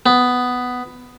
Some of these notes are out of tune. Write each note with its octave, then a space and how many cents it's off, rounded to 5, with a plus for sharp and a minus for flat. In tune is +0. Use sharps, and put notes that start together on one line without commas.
B3 +10